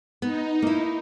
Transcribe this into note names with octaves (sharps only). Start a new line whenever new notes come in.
B3 D#4
A#3 E4